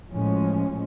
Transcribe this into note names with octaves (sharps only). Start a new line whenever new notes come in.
A2 F3 G#3 C#4